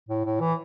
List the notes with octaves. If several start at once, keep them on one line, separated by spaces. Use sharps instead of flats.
A2
A2
E3